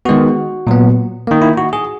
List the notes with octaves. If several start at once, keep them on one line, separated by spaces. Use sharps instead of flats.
D#3 G#3 B3 F#4
A#2 F#3 B3
D#3 A#3
E4
F#4
G#4